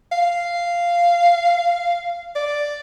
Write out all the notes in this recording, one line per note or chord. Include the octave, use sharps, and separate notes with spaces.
F5
D5